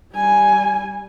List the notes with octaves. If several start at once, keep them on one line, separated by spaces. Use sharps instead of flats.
G3 G#5